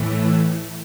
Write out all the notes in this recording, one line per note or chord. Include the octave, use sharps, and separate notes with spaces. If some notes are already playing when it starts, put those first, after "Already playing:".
Already playing: A2 E3 A3